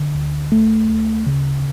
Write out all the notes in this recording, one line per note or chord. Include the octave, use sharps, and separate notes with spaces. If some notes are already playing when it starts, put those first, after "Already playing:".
Already playing: D3
D2
A3
D2
C#3